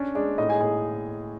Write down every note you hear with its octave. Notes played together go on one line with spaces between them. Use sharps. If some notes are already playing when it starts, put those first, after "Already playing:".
Already playing: C#4 D4 D5
G#3 D4 D5
A2 D#4 D#5
G#4 G#5
A2 G#4 G#5